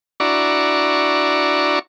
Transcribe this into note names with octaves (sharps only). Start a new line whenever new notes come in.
D4 E4 F#4 D5 A#5 C#6